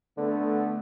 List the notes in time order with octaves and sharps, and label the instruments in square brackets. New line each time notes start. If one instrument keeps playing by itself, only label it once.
[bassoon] D3 [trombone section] A3 B3